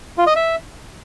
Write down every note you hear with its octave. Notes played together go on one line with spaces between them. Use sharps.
F4
D#5
E5